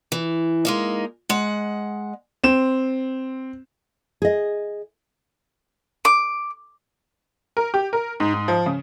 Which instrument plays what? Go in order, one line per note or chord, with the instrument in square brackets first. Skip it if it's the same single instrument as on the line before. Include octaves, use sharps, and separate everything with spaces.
[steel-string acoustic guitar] E3
G#3 A#3 D#4
G#3 F#5
[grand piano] C4 E7
[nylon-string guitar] G#4 D#5
[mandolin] D6
[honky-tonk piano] A#4
G4
A#4
G#2
G#2
F3
C#3